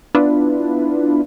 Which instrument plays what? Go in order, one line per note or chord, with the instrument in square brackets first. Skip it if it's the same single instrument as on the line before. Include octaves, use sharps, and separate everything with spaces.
[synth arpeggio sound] B3 D4 E4 F4 B4